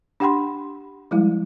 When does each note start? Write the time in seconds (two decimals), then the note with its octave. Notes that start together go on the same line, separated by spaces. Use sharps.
0.20 D4 G4 F#5 G5 B5 C6
1.11 F3 G3 G#3 E4